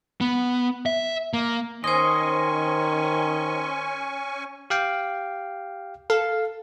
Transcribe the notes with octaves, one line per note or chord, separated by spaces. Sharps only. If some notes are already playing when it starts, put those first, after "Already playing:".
B3
E5
A#3
D#3 C#4 C5 D#5 G#5 C6 C#6
G4 F5 G5
A4 F5